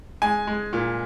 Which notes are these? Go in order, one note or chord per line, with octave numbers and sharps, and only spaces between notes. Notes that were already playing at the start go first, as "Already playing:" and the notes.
G#3 G#5
G#3
A#2